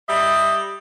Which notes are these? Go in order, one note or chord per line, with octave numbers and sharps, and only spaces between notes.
G3 D#5 E5